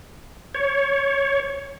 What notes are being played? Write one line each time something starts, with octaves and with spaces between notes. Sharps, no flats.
C#5